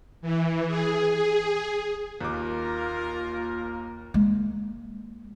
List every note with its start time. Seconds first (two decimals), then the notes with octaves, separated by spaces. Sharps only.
0.22 E3
0.67 G#4
1.11 G#4
2.21 D#2 A#3 F4 A#4 D6
4.14 G#3 A#3